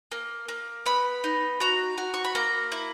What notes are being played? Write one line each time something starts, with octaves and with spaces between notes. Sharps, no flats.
A#3
A#3
B3 B5
D#4
F#4 A#5
F#4
C#6
B5
A#3 A#5
E4